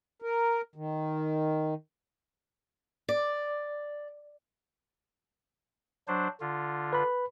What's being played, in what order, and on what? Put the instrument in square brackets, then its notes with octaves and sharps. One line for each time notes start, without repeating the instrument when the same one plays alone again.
[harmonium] A#4
D#3
[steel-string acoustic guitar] D5
[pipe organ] F#3 D4 C5
D3 F4
[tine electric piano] B4 B5